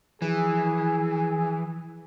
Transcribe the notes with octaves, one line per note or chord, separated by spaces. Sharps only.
E3 F3 E4 G#4